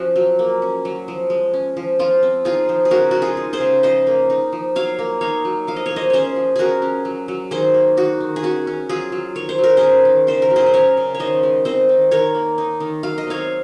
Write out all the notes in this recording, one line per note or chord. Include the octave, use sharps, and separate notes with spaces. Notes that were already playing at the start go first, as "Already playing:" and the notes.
Already playing: F3 C#4 F#4
F#3
A#3
C#4
F#3
F3
G#3
C#4
F3
F3 F4
C4
D#4 F4 G#4
F3
G#4
C#3 F#4 A#4
G#3 F#4
F4 G#4
D#4
G#4 C5
C#3
F3 C5 D#5
A#3
D#4
F3
F#3 C#5 F5
A#3
D#4 C#5 F5
F#3
F3 F5
D#5
A#3 C#5
C5 D#5
C#4 G#4 C5 C#5
F3
C#4 F#4 G#4 A#4
C#4
F#3
F#3
D#3 G#4 C5
A#3
D#4 F#4
D#3
G#4
C#4 F#4
C#4
F#3 F4 G#4
F#3
D#3 C#5
C5
F#3 A#4
C#4 G#4 C5
D#3
C#3 C5
A#4
F#3
G#4 C5
C5
C#4 A#4 C#5
C#3
C#5
D#3 C5 D#5
G#3
C4 C5 D#5
D#3
D#3 A#4 C#5
A#3
D#4
D#3
F#3 F5
D#5
C4 C#5 F5